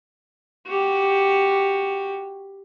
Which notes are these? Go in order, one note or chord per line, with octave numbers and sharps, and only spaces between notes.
F#4 G4